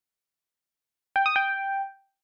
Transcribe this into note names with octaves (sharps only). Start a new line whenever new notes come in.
G5
D#6
G5